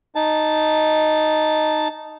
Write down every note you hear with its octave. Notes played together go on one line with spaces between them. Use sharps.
D#4 A5